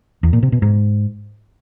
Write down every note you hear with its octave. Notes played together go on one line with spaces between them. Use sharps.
E2
A#2
C3
B2
G#2